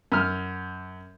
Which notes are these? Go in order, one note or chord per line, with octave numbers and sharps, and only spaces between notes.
F#2 F6